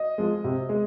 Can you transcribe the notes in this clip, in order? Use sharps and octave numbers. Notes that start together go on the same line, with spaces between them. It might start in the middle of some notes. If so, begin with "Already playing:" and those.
Already playing: D#5
F3 G#3
C3
G#3